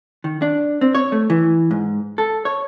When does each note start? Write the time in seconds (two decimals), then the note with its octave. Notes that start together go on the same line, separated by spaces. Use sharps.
0.24 D#3
0.42 D4
0.81 C4
0.95 C#5
1.12 A3
1.30 E3
1.71 G#2
2.18 A4
2.45 C#5